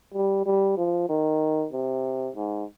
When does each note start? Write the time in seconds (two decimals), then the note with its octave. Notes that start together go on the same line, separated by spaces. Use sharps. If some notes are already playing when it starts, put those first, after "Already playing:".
0.14 G3
0.46 G3
0.77 F3
1.09 D#3
1.73 C3
2.35 G#2